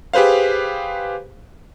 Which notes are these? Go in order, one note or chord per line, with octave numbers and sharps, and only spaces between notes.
G4 G#4 B4 C5 F5